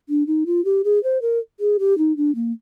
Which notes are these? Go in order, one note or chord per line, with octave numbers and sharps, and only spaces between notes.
D4
D#4
F4
G4
G#4
C5
A#4
G#4
G4
D#4
D4
A#3